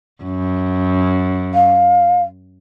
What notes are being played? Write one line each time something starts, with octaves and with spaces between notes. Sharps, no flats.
F#2
F5